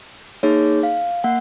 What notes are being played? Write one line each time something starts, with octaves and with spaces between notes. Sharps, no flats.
A#3 D#4 G#4 C#5
F5
A#3 F#5